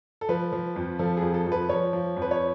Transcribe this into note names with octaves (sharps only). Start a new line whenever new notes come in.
A4
F3 B4
F3
F2
F3 A4
F2 G#4
A4
F2
B4
F3 C#5
F3
F2
B4
C#5